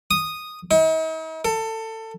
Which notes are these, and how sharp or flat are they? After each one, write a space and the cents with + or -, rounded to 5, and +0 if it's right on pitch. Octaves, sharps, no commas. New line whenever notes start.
D#6 -5
D#4 +45
A4 +20